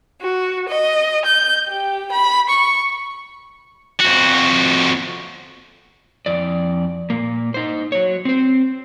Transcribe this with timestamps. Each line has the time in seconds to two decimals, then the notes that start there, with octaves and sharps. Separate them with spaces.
0.21 F#4
0.67 D#5
1.24 G6
1.66 G4
2.12 B5
2.48 C#6
4.00 F2 F#4
6.26 F2 D5
7.10 A#2 A#3
7.54 D#4 C5
7.92 F#3 C#5
8.25 C4 C5